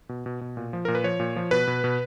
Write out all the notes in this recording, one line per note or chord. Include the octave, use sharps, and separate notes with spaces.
B2
B2
B2
A#2
F3
A#2 A#4
B4
F3 C#5
A#2
F3
B2 B4
B2
B2